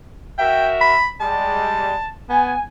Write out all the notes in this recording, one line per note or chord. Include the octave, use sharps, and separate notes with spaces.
F#4 A#4 E5 G5
B5
G3 G#3 A5
B3 G#5